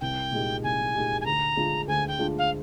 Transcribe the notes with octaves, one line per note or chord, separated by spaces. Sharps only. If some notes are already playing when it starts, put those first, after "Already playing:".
C2 G5
A#2 G#3 D#4 G4
C2 G#5
A#2 G#3 D#4 G4
G#5
D2 A#5
D3 G#3 D4 F4
D2 G#5
G5
D3 G#3 D4 F4
F5